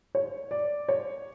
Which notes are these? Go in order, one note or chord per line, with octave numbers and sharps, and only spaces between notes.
C#5
D5
C#5